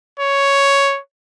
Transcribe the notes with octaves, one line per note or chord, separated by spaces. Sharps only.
C#5